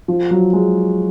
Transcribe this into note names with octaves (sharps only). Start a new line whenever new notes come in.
F3
F#3
G#3